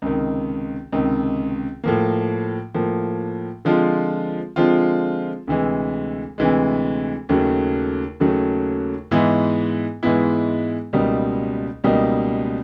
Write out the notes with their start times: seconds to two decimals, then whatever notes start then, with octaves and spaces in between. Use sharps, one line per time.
0.02 C#2 C3 D#3
0.92 C#2 C3 D#3
1.84 A2 F3 A#3
2.74 A2 F3 A#3
3.65 D3 F3 G#3 C4 F4
4.56 D3 F3 G#3 C4 F4
5.47 D2 C3 E3 G#3
6.38 D2 C3 E3 G#3
7.29 D#2 C#3 F#3 A3
8.20 D#2 C#3 F#3 A3
9.11 G#2 E3 G#3 B3 E4
10.03 G#2 E3 G#3 B3 E4
10.93 C#2 B2 G3 A#3 D#4
11.84 C#2 B2 G3 A#3 D#4